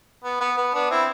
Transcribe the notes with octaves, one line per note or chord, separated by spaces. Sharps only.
B3
B3
B3
B3 D4
C4 E4